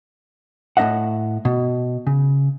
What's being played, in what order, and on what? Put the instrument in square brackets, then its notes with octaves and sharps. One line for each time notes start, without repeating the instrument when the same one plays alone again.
[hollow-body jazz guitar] A2 A3 D4 D#5 E5 F#5
B2
C#3